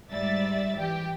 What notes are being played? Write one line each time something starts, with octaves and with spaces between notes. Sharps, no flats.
G#2 G3 D5 E5 A6
E3 G4 G5